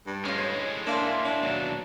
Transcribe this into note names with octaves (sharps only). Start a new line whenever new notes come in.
G2
A2 G#3 C#4 F4 F6
C5 C#5
A#3 D4 E5 F5 C6
D4
D#2 B2 F#3